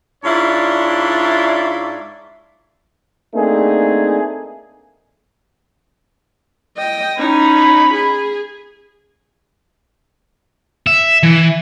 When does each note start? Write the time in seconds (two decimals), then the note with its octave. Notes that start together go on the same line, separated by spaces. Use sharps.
0.24 G#2 D4 E4 F4 C#5 D5
3.35 A3 A#3 C4 D4 D#4 G#4
6.78 D#5 G5
7.18 C#4 D#4 B5
7.93 G#4
10.87 E5
11.23 E3